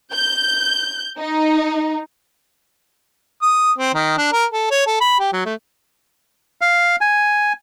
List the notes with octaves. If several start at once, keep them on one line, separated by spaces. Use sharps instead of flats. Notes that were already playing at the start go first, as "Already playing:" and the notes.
G6
D#4
D#6
C4
D#3
D4
A#4
A4
C#5
A4
B5
G4
F#3
A3
F5
G#5